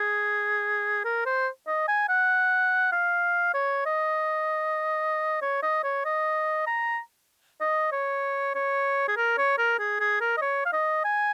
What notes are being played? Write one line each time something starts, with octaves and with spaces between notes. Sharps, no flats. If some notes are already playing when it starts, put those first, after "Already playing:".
Already playing: G#4
A#4
C5
D#5
G#5
F#5
F5
C#5
D#5
C#5
D#5
C#5
D#5
A#5
D#5
C#5
C#5
G#4
A#4
C#5
A#4
G#4
G#4
A#4
D#5
C#5
F5
D#5
G#5